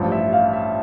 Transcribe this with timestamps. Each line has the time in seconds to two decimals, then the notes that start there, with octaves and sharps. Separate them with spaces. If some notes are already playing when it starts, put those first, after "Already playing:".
Already playing: A1 G2 F3
0.12 E5
0.32 F5
0.53 E5